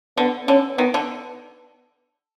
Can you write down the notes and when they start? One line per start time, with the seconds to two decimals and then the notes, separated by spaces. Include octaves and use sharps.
0.17 D3 B3
0.48 D3 C#4
0.78 D#3 B3
0.94 D3